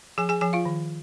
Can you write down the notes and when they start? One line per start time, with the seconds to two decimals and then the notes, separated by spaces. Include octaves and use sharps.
0.18 F3 G#4 G#5
0.29 G#4 G#5
0.41 F3 G#4 G#5
0.53 F4 F5
0.65 D#3